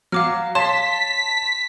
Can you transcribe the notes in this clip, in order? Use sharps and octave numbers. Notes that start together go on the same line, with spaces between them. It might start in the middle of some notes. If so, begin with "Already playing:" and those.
F#3 F5 D6 F6
C#5 F5 A5 C6 B6 E7